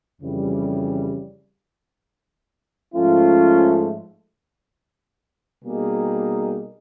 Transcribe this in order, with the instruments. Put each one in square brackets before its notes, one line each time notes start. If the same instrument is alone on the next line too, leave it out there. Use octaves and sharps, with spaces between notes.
[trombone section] F2 C#3 E3 G3
G#2 F3 A3 C#4 F4
B2 G3 A#3 D#4 G#4